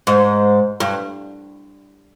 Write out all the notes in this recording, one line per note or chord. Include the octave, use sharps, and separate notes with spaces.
G#2
G2